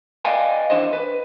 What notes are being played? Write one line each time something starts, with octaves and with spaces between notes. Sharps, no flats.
B4 D5 D#5 F5 G5 G#5
E3 D4 C5 D#5
B4